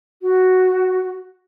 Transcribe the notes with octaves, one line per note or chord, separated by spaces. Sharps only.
F#4